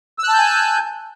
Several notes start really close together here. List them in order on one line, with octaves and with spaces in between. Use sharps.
E6 F#6 A5 G6 G#5